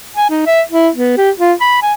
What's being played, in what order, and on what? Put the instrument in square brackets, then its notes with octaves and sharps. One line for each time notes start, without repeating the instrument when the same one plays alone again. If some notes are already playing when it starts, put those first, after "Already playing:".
[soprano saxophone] G#5
D#4
E5
E4
B3
G4
F4
B5
G#5